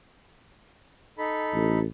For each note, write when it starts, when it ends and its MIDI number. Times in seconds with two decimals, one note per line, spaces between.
1.18 1.79 63
1.18 1.79 69
1.18 1.79 83
1.54 1.85 33